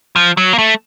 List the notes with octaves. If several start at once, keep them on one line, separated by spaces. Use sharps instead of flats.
F3
F#3
A#3
A3